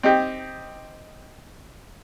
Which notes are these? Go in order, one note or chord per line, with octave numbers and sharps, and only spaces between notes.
C4 D#4 G4